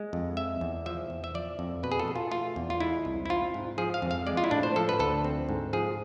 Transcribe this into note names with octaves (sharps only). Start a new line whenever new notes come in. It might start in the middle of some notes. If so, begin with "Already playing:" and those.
Already playing: G#3
F2
G#3 E5
E2
F3 E5
E2
E5
F3 D5
F2
B2 B4
G#4
A4
B2
F4
A3 F4
E2
F4
G#3 E4
C2
E4
C4 F4
G#2
F3 G#4
F5
F2
F5
G#3 D5
F4
E4
A2 D4
C5
F3 A4
B4
D2 A4
C4
G#2
F3 G#4